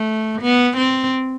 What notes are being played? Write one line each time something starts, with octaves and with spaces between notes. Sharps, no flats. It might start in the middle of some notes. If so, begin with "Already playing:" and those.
Already playing: A3
B3
C4